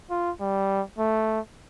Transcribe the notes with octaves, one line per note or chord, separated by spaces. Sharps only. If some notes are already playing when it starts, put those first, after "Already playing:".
F4
G3
A3